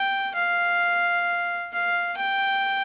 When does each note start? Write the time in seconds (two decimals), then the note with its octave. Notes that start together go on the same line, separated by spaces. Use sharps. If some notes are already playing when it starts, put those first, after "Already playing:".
Already playing: G5
0.35 F5
1.73 F5
2.17 G5